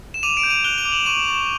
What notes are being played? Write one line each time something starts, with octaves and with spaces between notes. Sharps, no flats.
E7
D6 D#7 F7
D7 E7
G6
D#7 F7
F#6 F7 G7
F7 G7
D6
E7 F#7
C#6 D#7 F7
C#6